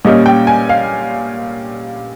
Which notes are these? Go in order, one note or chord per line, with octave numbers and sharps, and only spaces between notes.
A#2 G3 C#4 D#5
G5
G#5
F5